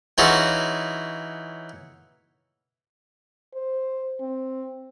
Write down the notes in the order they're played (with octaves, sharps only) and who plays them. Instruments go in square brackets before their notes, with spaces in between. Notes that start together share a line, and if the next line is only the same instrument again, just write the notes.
[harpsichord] E3 C#4 D#4 F4 F#4 G#4
[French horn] C5
C4